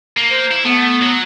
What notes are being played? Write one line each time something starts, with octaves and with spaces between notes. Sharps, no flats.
A#3
C5
E4
A3 B3
F#3 F#4